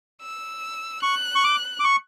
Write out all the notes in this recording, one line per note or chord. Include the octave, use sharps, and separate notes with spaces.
E6
C#6 F#6
C#6
D6
D6
C#6